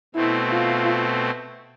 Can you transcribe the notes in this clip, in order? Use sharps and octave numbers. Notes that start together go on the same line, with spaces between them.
B2 A3 C4 E4
F4